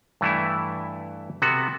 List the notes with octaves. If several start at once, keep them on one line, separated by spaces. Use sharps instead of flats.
G2 E3 A3 E4
C3 B3 F#4 A4